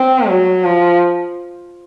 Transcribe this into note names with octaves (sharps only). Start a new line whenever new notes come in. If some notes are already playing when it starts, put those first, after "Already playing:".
Already playing: C4
F#3
F3